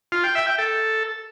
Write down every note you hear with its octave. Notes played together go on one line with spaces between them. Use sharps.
F4
G5
E5
G5
A4